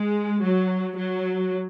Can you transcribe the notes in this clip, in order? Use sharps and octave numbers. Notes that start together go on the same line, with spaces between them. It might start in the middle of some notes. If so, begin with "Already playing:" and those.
Already playing: G#3
F#3
F#3